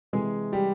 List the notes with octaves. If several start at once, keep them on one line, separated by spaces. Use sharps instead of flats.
C3 E3 G#3 G#4
G3 G4